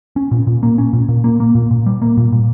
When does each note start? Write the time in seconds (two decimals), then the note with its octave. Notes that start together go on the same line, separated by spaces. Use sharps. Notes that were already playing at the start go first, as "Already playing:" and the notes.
0.16 C#4
0.31 A#2
0.47 A#2
0.63 A#3
0.78 C#4
0.93 A#2
1.09 A#2
1.24 A#3
1.40 A#3
1.55 A#2
1.71 A#2
1.86 G3
2.02 A#3
2.17 A#2
2.32 A#2